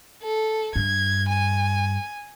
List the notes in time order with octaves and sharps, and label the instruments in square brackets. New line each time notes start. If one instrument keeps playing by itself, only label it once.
[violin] A4
[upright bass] G2 [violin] G#6
[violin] G#5